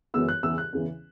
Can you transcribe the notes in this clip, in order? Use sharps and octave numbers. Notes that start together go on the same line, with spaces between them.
F#2 E3 G#3 B3 E6
F#6
E2 C#3 E3 E6
F#6
E2 C#3 E3